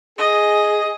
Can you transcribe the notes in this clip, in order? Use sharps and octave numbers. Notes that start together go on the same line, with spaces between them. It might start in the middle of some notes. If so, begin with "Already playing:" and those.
G#4 D#5